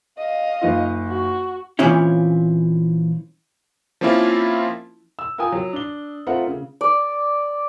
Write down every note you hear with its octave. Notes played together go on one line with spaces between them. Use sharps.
D#5 F5
F#1 D#4 F4
F#4
A#2 E3 F3 C4 C#4 E4
F3 A#3 C4 C#4 E4 F4
E6
F4 A#4 G5 G#5 D#6
F#3
D4 G7
A3 C4 F4 A#4 F#5
C#3
D5